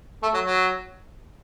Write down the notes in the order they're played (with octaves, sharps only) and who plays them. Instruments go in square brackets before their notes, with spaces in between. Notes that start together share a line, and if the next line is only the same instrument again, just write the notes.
[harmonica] A3
F#3
F#3